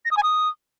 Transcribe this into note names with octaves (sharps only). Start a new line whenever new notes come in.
A#6
D#6
G#5
D#6